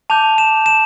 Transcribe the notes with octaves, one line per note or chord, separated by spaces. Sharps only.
A5 D6 G6 F7
E7
E7